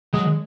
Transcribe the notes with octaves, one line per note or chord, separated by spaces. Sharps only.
F#3 G#3